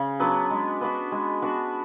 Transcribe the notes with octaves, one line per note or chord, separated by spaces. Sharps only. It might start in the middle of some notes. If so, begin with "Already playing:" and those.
Already playing: C#3
F#3 B3 D4
G#3
B3 D4 F#4
G#3
B3 D4 F#4